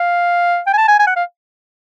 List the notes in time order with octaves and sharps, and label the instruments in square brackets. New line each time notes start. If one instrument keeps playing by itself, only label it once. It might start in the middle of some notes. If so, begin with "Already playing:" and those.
Already playing: [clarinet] F5
G5
G#5
A5
G#5
G#5
F#5
F5